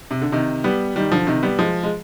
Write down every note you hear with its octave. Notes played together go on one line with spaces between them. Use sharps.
C3
D3
C3 D#3
G3 B3
D#3 G3
D3 F3
C3 D#3
G3 B3
F3 G#3
G#3